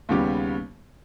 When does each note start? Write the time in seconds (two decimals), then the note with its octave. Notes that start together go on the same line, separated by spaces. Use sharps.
0.09 D#2 C#3 G3 B3 G4